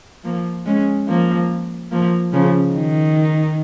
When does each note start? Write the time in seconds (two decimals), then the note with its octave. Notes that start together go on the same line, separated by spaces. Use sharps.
0.24 F3 A#3
0.66 G#3 C#4
1.08 F3 A#3
1.92 F3 A#3
2.33 C#3 F3
2.74 D#3